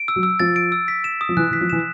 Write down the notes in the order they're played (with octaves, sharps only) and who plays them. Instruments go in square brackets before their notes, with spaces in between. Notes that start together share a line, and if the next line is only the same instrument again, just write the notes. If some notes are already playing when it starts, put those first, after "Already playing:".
Already playing: [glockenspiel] D7
E6
[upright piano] F#3
[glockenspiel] E6
[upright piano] F3 [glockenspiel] A6
[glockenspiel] D7
E6
B6
E7
D#6
[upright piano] F3
[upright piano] E3 [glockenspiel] F#6
[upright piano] E3 [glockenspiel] B6
[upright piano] F3
[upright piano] E3 [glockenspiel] E7